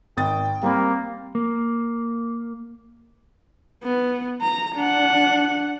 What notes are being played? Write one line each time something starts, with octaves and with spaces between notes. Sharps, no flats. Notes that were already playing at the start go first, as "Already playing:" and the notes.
G#1 G5 D#6 A6
G3 A#3 C4 B5
A#3
B3
A#5
D4 F#5